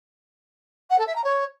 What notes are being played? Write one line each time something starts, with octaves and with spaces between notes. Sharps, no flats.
F#5
A4
E5
A#5
C#5